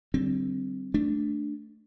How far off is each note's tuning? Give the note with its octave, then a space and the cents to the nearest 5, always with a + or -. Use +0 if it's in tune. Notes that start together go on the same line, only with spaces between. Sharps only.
D3 +0 G3 -35 C4 +0
A3 -5 D4 +0